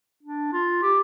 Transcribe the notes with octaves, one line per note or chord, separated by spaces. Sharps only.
D4
F4
G4